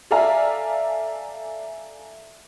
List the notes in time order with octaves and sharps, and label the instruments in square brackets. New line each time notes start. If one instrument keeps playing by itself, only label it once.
[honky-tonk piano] A4 D5 E5 F5 G#5 A#5